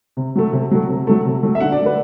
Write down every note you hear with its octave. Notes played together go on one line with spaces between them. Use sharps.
C3
F#3 A3
C3
F#3 A3
C3
F#3 A3
C3
F#3 A3
E5
D3 F#5
D5
A3
B4